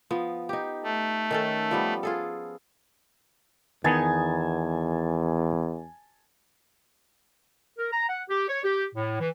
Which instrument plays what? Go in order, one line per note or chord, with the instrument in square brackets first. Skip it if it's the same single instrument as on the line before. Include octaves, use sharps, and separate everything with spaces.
[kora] F3 B3
D#4 G4
[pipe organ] A3
[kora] D#3 C#4 A4
F3 G3 B3
F4 G#4 A4
[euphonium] E2 [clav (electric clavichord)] D#3 B3 D#4 [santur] G#5 A5
[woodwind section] A#4
A#5
F#5
G4
C#5
G4
A2
E3